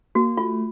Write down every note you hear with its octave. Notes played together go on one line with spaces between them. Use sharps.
A#3 F#4
A3 F4